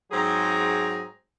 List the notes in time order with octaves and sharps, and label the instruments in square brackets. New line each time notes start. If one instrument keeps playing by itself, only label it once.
[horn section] G#2 F#3 C4 G#4 A#5